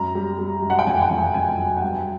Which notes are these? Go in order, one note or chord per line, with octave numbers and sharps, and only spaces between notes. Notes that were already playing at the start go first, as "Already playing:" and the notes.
Already playing: F#2 A#5
G3
G3
F#2
F#5
G5
F2 G#5
F#5
G5
F2
G5
F2 G#5
F#3
F#5
G2 G5